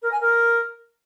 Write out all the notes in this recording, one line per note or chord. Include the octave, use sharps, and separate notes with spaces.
A#4
G#5
A#4